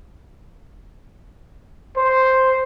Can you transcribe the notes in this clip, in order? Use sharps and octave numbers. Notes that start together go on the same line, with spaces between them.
C5